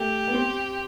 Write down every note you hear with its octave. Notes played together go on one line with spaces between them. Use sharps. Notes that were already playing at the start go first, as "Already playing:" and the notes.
Already playing: A3 G4
B3
C4